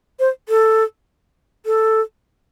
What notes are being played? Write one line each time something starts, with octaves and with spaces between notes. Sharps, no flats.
C5
A4
A4